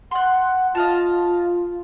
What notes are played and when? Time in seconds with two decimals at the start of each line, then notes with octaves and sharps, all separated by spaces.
0.11 F#5 C6 F#6
0.75 F4 D#5 F5 A5